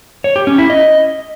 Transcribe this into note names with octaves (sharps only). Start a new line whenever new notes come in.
C#5
G4
C#4
E4
D#5